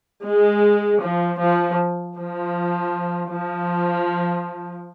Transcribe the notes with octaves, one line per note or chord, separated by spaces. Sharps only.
G#3
F3
F3
F3
F3